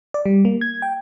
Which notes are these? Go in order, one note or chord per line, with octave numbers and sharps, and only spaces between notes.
D5
G3
A#3
G#6
G5